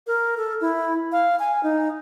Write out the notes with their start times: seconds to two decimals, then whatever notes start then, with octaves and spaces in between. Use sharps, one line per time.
0.07 A#4
0.37 A4
0.61 E4
1.12 F5
1.39 G#5
1.63 D#4